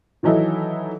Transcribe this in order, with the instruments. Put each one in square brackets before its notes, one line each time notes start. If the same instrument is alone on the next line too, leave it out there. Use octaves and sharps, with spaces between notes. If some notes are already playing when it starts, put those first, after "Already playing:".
[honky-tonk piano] D#3 E3 F#3 D#4 E4 A4